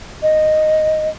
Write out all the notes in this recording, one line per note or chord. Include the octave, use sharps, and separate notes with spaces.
D#5